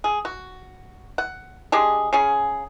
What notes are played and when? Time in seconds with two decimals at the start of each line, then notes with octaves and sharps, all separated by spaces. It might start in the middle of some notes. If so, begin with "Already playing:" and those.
0.04 G#4
0.25 F#4
1.18 F#5
1.72 G#3 D4 G4 G#4
2.13 C#3 C#4 G#4